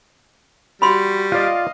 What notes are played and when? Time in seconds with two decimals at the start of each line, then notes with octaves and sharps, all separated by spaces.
0.82 G3 F#4 B5 C6
1.32 F4 D5 D#5 F5